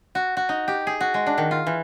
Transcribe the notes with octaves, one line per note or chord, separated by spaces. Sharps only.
F#4
F#4
D#4
G4
G#4
F#4
G#3
D4
D#3
F4
E3